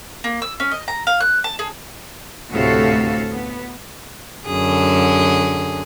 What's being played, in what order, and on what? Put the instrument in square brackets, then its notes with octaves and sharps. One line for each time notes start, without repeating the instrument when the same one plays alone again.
[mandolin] A#3
E6
C#4
D#5
A#5
F5
F#6
A5
G#4
[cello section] D2 A2 C3 F#4 A4 F5
B3
[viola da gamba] F#2 D3 G#4